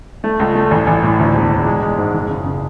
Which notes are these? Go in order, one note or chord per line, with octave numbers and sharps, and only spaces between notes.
A3
C#2
A3
A1
A1
A2
D2
E1
E1
G#3
G#3
G#2
F#1
C#3
C#3